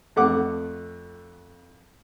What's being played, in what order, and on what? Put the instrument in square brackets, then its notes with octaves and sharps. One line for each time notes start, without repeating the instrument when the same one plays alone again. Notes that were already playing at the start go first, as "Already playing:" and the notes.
[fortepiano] F2 A3 F#5 D6